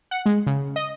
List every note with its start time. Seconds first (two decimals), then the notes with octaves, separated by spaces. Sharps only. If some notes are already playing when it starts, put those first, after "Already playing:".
0.11 F#5
0.26 G#3
0.47 C#3
0.76 D#5